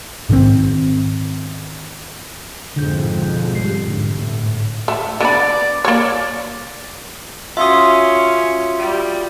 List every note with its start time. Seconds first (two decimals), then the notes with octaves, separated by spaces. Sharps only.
0.30 G#2 D#3 C4
2.76 B1 F2 G#2 D3 G6
3.55 G3 C7
3.88 G#2 D3
4.20 A2
4.88 A3
5.20 D3 B3 D5 B5
5.85 A#3 C#5 D5
7.57 C#4 F4 F#4 E5 C6 D#6
8.77 G3